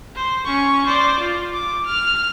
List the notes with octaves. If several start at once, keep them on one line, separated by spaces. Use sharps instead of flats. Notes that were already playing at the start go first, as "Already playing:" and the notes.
C5
C#4 C#6
C5 D5
F4
D6
F6